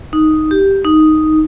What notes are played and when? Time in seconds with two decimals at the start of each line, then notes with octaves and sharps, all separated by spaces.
0.13 D#4
0.51 G4
0.84 D#4